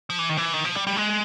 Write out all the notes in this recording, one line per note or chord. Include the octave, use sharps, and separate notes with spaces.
F3
E3
D#3
E3
D#3
F3
G3
G3
G#3